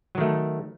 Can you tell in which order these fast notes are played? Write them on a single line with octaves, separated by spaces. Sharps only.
F#3 D#3 A3